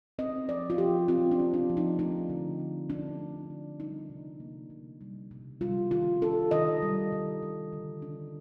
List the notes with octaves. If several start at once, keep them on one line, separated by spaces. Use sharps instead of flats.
C4 D#5
F3 D5
F4
F3 G4
C4 F4
D4
C4
D4
F3
D#4
A3 D#4
D3
C4
D3 D4
A3
D3
G3 D#4
C3
A#3
C3
G3
C3
G3 F4
D#3 F4
D4 A4
D#3 D#5
G3
D#3
G3
D3
D4